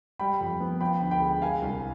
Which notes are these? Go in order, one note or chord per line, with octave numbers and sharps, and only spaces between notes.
G3 G5 B5
F2
B3
F3 G5 B5
D2
G5 B5
G#3
G#3 F5 G#5
C2